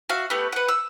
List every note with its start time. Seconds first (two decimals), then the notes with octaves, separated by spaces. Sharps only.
0.09 F#4 E5 F5
0.30 A3 B3 G4 B4
0.52 B4 F#5
0.68 E6